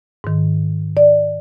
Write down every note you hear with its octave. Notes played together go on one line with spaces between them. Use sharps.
G#2 D#3
D5